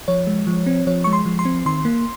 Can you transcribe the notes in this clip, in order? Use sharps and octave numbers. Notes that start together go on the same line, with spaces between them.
F3 C#5
G#3
F3
C4
F3 C#5
G#3 C#6
C6
F3
C6
C4
D#3 C6
A#3